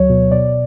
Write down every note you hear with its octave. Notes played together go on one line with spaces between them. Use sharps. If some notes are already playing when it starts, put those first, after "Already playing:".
Already playing: D2 F#3 C#5
B2
B2 D5